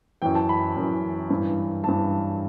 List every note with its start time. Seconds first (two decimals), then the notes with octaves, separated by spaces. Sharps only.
0.22 F#2 E3 G5
0.35 A5
0.49 B5
0.76 F#2 E3
1.30 G2 E3
1.84 G2 E3 A5